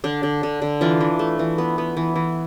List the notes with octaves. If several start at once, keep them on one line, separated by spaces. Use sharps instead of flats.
D3 D4
D3
D3
D3
E3 D4 F4
E3
A3
E3
B3
B3
E3
E3